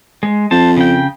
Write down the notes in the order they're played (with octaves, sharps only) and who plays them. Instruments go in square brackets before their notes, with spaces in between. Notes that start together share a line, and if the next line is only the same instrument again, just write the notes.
[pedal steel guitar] G#3
[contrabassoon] F2 [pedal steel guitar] C5 A5
[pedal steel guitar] C#3 G5